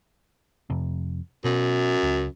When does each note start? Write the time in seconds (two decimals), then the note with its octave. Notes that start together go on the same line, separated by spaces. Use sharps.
0.70 F2 C3
1.44 F#2 B2
2.03 C#2